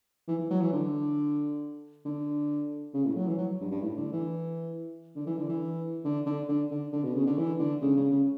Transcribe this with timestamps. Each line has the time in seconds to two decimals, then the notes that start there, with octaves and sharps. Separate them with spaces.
0.28 E3
0.39 E3
0.50 F#3
0.61 E3
0.73 D3
2.05 D3
2.94 C#3
3.05 A2
3.16 F#3
3.27 E3
3.38 F#3
3.60 G2
3.71 G2
3.83 A2
3.97 D3
4.12 E3
5.16 D3
5.26 E3
5.37 D3
5.49 E3
6.04 D3
6.26 D3
6.49 D3
6.71 D3
6.93 D3
7.04 B2
7.15 C#3
7.26 D3
7.38 E3
7.60 D3
7.82 C#3
7.97 C#3
8.11 C#3